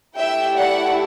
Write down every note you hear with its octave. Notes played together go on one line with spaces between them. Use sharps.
A3 E4 G4 E5 G5
D5 F#5